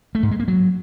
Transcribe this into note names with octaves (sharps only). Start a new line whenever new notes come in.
A3
G#2
G#3
A#3
F#3